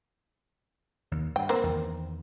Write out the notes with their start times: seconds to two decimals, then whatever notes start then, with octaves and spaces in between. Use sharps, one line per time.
1.11 D#2
1.36 G2 G5
1.49 A#3 C4
1.63 E2 D#3